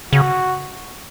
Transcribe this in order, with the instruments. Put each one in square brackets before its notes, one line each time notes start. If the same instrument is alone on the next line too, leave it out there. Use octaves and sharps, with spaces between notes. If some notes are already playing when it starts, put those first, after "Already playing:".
[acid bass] C#3 [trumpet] F#4